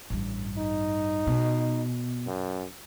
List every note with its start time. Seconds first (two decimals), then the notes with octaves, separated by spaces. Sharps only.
0.10 A1 G2
0.58 D#4
1.27 B2
2.27 F#2